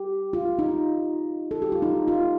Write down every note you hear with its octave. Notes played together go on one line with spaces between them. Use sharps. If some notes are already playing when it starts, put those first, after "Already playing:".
Already playing: G4
F4
D#4
A4
G4
F4
D#4
F4